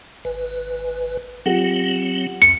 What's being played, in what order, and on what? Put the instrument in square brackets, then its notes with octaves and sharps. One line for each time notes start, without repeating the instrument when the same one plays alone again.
[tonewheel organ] G#1 B4
[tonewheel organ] F#3 C4 [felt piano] F4 G4 F#5
[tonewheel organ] C2 F2 [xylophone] C#7